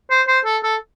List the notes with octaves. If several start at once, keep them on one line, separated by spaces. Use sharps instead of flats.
C5
C5
A4
A4